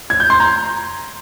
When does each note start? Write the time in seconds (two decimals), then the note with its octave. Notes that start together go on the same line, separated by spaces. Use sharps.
0.10 G#6
0.20 G6
0.30 C6
0.40 A#5